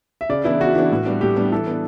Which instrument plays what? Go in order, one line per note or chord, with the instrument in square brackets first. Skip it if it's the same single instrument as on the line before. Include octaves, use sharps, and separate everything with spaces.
[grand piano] E5
[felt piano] C#3 [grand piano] D5
[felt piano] E3 B3 D4 [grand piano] E4
[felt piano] C#3 [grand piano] F#4
[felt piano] E3 B3 D4
A2
G3 B3 D4
[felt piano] A2 [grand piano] G4
[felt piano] G3 B3 D4
[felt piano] E3 [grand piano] A4
[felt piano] B3 D4